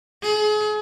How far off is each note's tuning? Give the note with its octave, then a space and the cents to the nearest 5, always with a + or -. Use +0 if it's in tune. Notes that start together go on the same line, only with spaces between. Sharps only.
G#4 +35